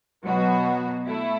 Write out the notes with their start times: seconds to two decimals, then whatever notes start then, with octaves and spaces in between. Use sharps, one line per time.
0.23 B2 F#3 B3 F#4
1.06 A3 E4